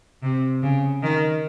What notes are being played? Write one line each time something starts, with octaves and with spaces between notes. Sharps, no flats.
C3
C#3
D#3